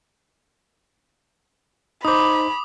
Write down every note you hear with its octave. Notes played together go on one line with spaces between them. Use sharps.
D#4 C5 B5 D6 D#6